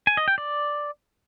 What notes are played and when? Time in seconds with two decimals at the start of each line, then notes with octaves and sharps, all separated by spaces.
0.07 G#5
0.17 D#5
0.28 G5
0.38 D5